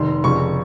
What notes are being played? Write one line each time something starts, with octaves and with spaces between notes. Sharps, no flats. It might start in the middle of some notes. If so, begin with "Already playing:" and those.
Already playing: F1 D#3 C6
F1 F2 C#3 F3 C#6